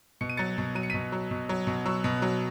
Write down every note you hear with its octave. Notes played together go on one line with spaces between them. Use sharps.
B2 C#7
D#7
F#3 A6 C#7
B2
F#3 D#7
C#7
B2 B6 D#7
F#3
B2
F#3
B2
F#3 C#6 E6
B2
F#3